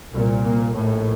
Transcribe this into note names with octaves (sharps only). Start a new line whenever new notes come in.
C2 A#2
A#3
A#1 A2